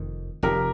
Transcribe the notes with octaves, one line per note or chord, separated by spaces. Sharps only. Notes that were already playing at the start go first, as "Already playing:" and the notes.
Already playing: F1 F2 D#3
F1 F2 D#3 G4 A#4